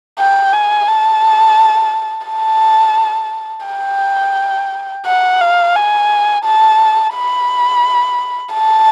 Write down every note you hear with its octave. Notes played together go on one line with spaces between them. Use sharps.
G5
G#5
A5
A5
G5
F#5
F5
G#5
A5
B5
A5